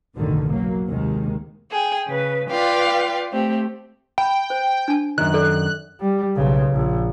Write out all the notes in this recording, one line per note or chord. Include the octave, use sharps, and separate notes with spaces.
F#1 B1 E2 A2 D3 D#3
F#3 A#3
D#2 C3 D#3 G#3
G#4 G5
C#3 B4
F4 B4 D5 F5 G5
A3 C4 G4
G5 B5
C5
D4 A5
F#2 D#3 F#6
A4 A#4 D5
G3
B1 C#3
A#1